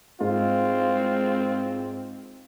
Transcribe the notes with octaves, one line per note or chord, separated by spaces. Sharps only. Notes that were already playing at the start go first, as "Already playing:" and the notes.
G#2 C4 F4